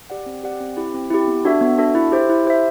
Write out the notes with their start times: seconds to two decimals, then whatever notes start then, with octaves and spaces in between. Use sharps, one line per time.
0.10 G4 D5 F#5
0.26 C4
0.43 G4 D5 F#5
0.61 C4
0.77 E4 G4
0.94 C4
1.11 E4 G4
1.28 B3
1.45 D4 F#4 A4 E5
1.61 B3
1.78 D4 F#4 A4 E5
1.95 E4
2.12 G4 C5 E5
2.29 E4
2.45 G4 C5 E5